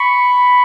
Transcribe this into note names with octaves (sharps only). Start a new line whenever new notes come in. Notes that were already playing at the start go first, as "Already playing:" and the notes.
Already playing: B5 C#6